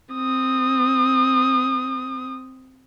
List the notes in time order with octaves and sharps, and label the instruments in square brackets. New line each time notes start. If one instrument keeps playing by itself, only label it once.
[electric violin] C4 D#6